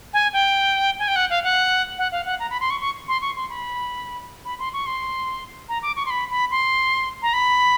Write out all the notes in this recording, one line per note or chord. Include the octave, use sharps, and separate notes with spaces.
G#5
G5
G#5
G5
F#5
F5
F#5
F#5
F5
F#5
A#5
B5
C6
C#6
C#6
C6
C#6
C6
B5
B5
C6
C#6
C6
A#5
D6
C#6
C6
B5
B5
C6
A#5
B5